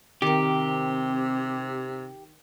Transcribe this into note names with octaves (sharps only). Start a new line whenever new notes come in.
C3 D#3 C4 G4 A#4